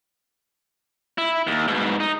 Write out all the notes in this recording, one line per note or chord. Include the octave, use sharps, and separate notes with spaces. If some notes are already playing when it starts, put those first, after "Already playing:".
E4
D#2
G#2 B2
D#4